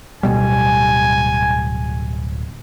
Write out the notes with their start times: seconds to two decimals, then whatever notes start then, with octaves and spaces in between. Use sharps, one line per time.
0.23 D1 B2 G3 G#5